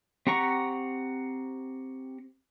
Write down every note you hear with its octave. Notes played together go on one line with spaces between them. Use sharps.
C4 G4 F#5 A#5 C#6